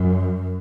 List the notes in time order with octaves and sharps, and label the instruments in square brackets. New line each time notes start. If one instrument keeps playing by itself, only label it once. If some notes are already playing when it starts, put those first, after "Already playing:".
Already playing: [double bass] F#2